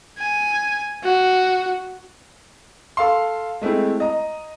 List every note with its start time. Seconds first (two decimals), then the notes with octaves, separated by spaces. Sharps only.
0.19 G#5
1.04 F#4
2.97 A4 F5 C6
3.61 G#3 A3 C4 E4
4.00 D#5 A#5